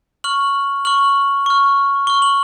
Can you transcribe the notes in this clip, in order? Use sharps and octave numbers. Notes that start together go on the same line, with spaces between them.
C#6 F6 F#7
C#6 F6 F#7
C#6 F6
C#6 F6 G7
F#7